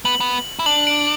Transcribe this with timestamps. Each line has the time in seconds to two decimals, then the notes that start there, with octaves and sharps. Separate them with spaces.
0.05 B3 F#7
0.20 B3
0.59 E4
0.66 D4 F#7
0.87 D7